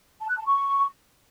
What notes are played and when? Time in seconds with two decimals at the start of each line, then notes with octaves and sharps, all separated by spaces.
0.21 A5
0.29 F#6
0.38 A5
0.46 C#6